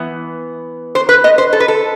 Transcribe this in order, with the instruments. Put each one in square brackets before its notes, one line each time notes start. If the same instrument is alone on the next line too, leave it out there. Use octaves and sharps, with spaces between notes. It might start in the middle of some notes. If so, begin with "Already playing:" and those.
Already playing: [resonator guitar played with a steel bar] E3 B3
C5
B4
D#5
C5
A4
B4
A4